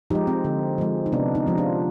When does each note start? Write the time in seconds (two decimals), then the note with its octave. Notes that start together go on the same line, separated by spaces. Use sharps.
0.10 F3 G#3 D#4 G4
0.27 C4
0.44 D3
0.78 F3 G#3
1.06 D#4
1.12 C3 B3 D4
1.35 C4 D#4
1.47 F3 G#3
1.57 D4 F4